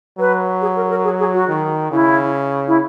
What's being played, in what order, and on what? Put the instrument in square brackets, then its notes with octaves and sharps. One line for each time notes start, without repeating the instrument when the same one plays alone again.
[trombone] F#3 [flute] B4
[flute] G#4
A#4
A#4
G#4
G#4
F#4
[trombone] D#3
[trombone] C#3 [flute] E4
[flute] E4